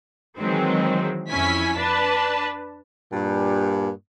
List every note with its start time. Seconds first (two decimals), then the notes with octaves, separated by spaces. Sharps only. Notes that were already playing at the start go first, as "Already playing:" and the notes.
0.38 D#3 E3 F#3 G#3 C4
1.30 F2 C#4 E4 G#5 B6
1.77 D4 B4 A5
3.13 G2 A#2